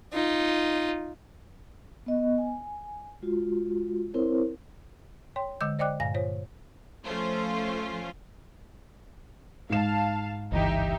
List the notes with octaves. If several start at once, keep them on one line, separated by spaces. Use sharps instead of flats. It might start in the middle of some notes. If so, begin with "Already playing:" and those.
D#4 F4
B3 D#5
G#5
G#3 F4 F#4
C4 E4 A#4 C5 C#5
C#5 G5 C6
D3 G#3 D#5 E6 G6
C5 D5 D#5 G5 D6 F#6
G2 A#2 F5 G#5 A#6
F4 C5 C#5
F3 A3 C#4 F4 C5
G#2 F5 A5 E7
G1 C#2 E3 D#4 G4 E5